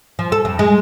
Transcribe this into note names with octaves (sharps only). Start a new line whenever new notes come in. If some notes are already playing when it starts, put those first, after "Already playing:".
F3
A4
F2
G#3